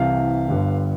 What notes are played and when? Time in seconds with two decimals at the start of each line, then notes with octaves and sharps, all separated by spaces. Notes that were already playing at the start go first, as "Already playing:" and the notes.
Already playing: C2 C3 E3 F5
0.48 G1 G2 D3